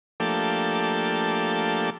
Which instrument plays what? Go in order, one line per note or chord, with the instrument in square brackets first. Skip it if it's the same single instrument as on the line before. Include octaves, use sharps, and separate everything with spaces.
[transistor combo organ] F3 A3 A#3 D4 G4 A4